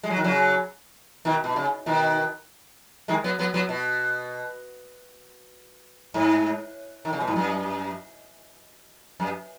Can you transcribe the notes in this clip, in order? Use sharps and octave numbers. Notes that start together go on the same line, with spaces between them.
G#3
F#3
D#3
C#3 F#3
B2 D#3
B2
C#3
B2 D#3
D#3 G#3
F#3 B3
F#3 B3
F#3 B3
B2
G#2
D#3
C#3
B2
G#2
F#2
F#2